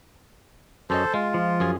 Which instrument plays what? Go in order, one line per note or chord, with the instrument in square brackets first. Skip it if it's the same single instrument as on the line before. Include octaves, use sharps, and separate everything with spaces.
[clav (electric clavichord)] F#2 C#4 D#5 [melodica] A4 C5
[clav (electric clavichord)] G#3 [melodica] F4
[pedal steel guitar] F3
[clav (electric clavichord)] F#2 G#4 G#5